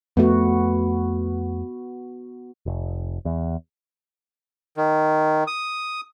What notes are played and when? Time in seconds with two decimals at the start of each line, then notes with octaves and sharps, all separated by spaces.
0.17 F2 A3 B3 F#4
2.66 F1
3.25 E2
4.77 D#3
5.47 D#6